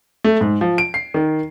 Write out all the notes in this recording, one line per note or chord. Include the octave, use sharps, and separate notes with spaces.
A3
G#2
F3
D7
C7
D#3